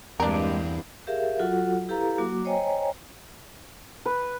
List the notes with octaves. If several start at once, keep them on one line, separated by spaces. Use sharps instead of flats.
E2 G2 G#3 A#3 C4 D4 A#4
G4 G#4 A#4 E5 F5
F#3 F4 F#4 A4 F#5
E4 G4 A4 B4 F5 A#5
F#3 A#3 F#4 D6
C5 C#5 D#5 G5 G#5 A#5
B4